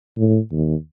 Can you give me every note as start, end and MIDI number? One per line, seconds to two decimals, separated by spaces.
0.17 0.38 45
0.52 0.75 39